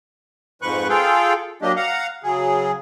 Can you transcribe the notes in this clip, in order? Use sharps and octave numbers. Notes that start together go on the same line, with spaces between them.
F2 G#2 F3 B4 C#6 F#6
F4 G#4 A4 F5 G5
F#3 A#3 D4 G4 D#5
F5 F#5 A#5
C#3 F#3 G#4